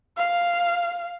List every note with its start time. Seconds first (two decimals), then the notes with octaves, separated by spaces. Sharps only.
0.17 F5